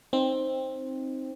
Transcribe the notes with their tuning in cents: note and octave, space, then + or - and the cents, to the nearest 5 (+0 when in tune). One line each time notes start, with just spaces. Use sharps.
C4 +10 D#4 +0